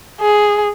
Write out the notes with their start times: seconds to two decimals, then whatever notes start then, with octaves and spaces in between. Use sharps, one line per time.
0.21 G#4